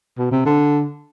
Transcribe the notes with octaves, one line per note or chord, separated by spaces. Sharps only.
B2
C3
D3